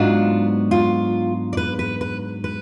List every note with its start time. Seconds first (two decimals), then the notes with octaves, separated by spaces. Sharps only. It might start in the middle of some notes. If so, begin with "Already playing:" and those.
Already playing: G#2 F#3 B3 D4 F4
0.71 F4
1.53 D5
1.57 B4
1.79 B4
2.01 B4
2.44 B4